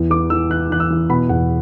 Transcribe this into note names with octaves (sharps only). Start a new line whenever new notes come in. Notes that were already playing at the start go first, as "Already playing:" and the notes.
Already playing: E2 E3
E3 D6
E3 E6
E3 F#6
E3 F#6
E6
E3
B2 B5
E2 F#5